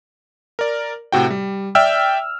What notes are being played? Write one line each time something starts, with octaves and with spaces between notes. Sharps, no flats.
A#4 D5
A2 C3 F#4 G5
G3
D5 E5 G5 E6 F6